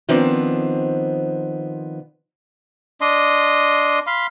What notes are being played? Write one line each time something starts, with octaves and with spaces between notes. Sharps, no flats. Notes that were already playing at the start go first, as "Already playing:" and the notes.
D#3 F3 B3 C4 D4
D4 D#5 C6
F5 B5 C6